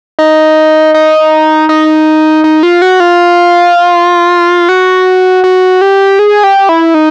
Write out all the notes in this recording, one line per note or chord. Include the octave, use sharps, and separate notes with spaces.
D#4
D#4
D#4
D#4
F4
F#4
F4
F#4
F#4
G4
G#4
G4
E4
D#4